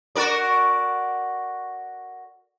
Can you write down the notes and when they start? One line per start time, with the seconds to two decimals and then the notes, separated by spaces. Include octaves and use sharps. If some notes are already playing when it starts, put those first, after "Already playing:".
0.16 F#4 A#4 D5